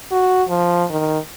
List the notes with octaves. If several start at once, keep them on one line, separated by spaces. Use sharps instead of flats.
F#4
F3
D#3